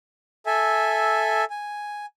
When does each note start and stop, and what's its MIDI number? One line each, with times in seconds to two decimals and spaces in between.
0.46 1.45 69
0.46 1.45 76
0.46 1.45 80
1.50 2.06 80